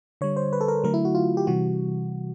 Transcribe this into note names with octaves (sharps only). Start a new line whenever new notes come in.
D3 G3 C#5
C5
B4
A4
A#4
D3 F#3 A3 A#4
E4
F#4
F4
G4
C3 E3 G3 F#4